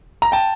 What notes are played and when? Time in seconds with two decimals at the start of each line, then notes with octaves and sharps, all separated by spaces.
0.22 A#5
0.32 G5 A5